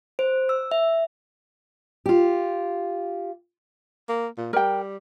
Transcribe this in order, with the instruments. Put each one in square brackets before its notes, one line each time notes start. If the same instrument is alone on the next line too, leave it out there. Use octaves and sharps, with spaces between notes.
[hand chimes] C5
E6
E5
[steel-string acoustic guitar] F4 G4
[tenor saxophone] A#3
A#2
[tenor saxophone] G3 [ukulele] A#4 G5